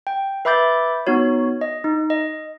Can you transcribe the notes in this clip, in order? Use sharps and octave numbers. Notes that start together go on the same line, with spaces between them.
G5
B4 E5 B5 D6 G6 A6
B3 D#4 F#4 C#5
D#5
D#4
D#5